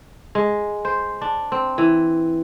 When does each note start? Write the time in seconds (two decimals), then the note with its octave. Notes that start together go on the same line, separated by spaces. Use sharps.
0.35 G#3
0.85 C5
1.21 D4
1.52 C4
1.78 E3